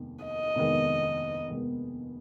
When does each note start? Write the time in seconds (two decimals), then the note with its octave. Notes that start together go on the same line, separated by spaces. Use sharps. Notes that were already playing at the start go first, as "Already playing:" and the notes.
Already playing: F1 D#2 D#3 G#3 B3
0.25 D#5
0.55 F1 D#2 D#3 G#3 B3
1.50 F1 D#2 D#3 G#3 B3